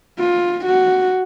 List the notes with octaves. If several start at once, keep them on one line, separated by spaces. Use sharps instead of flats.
F4
F#4